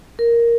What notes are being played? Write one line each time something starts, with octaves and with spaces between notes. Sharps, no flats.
A#4